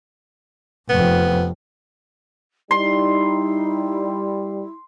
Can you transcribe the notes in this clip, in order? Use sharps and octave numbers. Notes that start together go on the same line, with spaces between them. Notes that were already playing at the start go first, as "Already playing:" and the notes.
F1 F2 B3
G3 D#4 E4 C6